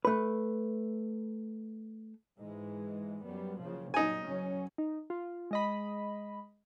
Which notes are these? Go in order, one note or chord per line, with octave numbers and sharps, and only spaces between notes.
A3 B4
G#2 E3 G#3
F#2 G3 B3
F#1 C#3 F3
F#2 A#2 F#3 D#4 G#5
F#1 F#3 C#4
D#4
F4
G#3 D#5 B5